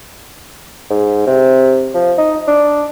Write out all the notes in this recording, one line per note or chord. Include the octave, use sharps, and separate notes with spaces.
G#2
C3
F3
D#4
D4